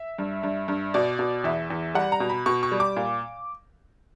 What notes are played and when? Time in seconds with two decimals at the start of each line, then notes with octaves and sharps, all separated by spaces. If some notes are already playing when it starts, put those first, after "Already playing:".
Already playing: E5
0.18 G2
0.43 G2
0.68 G2
0.94 B2 D5
1.19 B2
1.44 E2 E5
1.70 E2
1.95 G3 F#5
2.12 A#5
2.20 B2
2.29 B5
2.46 B2 C#6
2.63 C#6
2.72 G3
2.80 D6
2.97 A#2